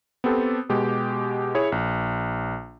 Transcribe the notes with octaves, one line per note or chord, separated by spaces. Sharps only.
B3 C4 G4 A4
B2 G#3 G4
E4 G#4 C#5
A#1